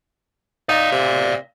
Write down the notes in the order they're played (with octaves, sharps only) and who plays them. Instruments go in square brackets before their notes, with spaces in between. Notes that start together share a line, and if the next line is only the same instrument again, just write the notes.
[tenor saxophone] D#4 [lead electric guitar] D5 F5
[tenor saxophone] C3